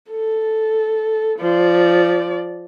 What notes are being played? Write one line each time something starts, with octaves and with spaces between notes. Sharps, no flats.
A4
F3 D5